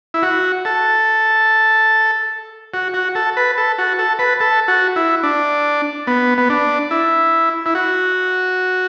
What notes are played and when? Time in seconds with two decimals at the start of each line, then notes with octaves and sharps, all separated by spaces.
0.14 E4
0.23 F#4
0.65 A4
2.74 F#4
2.94 F#4
3.15 A4
3.37 B4
3.58 A4
3.78 F#4
3.99 A4
4.19 B4
4.40 A4
4.68 F#4
4.96 E4
5.23 D4
6.07 B3
6.38 B3
6.49 D4
6.91 E4
7.66 E4
7.75 F#4